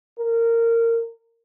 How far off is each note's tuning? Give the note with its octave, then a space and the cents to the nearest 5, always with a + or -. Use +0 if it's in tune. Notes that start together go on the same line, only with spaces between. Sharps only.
A#4 -20